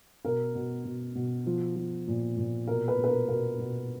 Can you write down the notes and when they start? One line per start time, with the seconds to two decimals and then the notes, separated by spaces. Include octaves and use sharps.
0.24 B2 A#4
0.55 B2
0.84 B2
1.15 B2
1.46 F3
1.76 F3
2.07 A#2
2.37 A#2
2.68 B2 A#4
2.88 B4
2.98 B2
3.04 B4
3.08 A#4
3.29 B2 A#4
3.59 B2